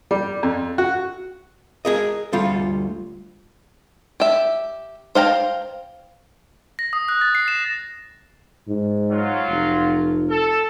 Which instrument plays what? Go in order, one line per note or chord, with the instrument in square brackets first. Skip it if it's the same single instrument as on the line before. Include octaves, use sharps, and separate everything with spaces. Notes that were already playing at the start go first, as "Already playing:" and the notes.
[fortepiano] G3
F2
F#4
[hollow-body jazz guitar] G#4 A#4 D#5
D2 G3 F4 A4
[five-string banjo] G4 E5
C5 F5 G5 A#5
[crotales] A#6
D#6
F#6
A6
C7
E7
[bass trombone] G#2
[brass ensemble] F#3 F4
[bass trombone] F1
[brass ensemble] A4